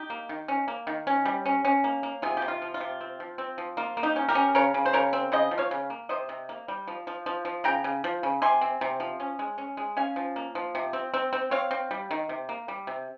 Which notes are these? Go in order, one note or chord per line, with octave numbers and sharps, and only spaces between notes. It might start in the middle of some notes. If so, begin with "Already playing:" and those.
Already playing: D#4 G4
A#3
D#3
C#4
A#3
D#3
C#4
G3
C#4
C#4
A#3
A#3
C3 F4 G#4
G4
C3
F4
F3
F4
C3
C4
F3
C4
F3
A#3 F4
A#3
D#4 G4
C#4
G4 A#4
C#4
C#3 A#4 C#5
C#3
C5
C#3 A#4 C#5
C4
C#3 C5 D#5
F3
C#5 F5
C#3
A#3
C3 C5 D#5
C3
A#3
G3
F3
F3
F3
F3
C#3 G5 A#5
C#3
F3
C#3
C3 G#5 C6
C4
C3
F3
C#4
G#3
C#4
G#3
C#4 F5 G#5
F3
A#3
F3
C3
C4
C4
C4
C4 C#5 F5
C4
G3
D#3
C3
A#3
G3
C3